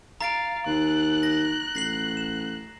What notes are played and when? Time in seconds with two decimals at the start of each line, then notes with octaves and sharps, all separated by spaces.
0.21 F5 A#5 A6 D7
0.67 D#2 F#6
1.23 A#6
1.75 A1 A#6 C7 F#7
2.17 E7